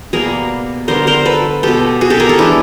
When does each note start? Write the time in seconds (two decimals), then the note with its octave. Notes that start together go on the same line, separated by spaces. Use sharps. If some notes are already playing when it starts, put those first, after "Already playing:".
0.13 B2 G3 A#3 G#4 A#4
0.88 D3 G3 B3 A#4 C5
1.07 A#4 C5
1.25 A4 B4
1.63 B2 G#3 B3 G4 A4
2.01 F#4 G#4
2.10 G4 A4
2.20 G#4 A#4
2.29 G4 A4
2.39 E3 G#3 B3 D4 E4